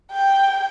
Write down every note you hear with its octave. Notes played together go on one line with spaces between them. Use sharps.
G5